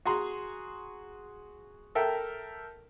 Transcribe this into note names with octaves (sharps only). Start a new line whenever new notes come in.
F#4 G#4 A#5 C6
A4 A#4 E5 G5